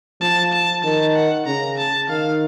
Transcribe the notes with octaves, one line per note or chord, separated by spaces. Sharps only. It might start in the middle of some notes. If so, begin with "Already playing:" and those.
F3 A5
A5
D#3 A5
F#5
C#3 A#5
A5
D#3 F5